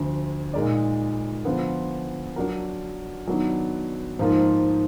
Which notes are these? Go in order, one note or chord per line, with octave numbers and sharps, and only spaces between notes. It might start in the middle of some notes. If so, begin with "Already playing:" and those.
Already playing: D2 D3 F3
A#2 G#3 D#4 A#4 D5
D3 F3 B3 F4 B4
F#3 D4 F#4 A#4
D#3 F#3 B3 D4
G#2 F3 A#3 F4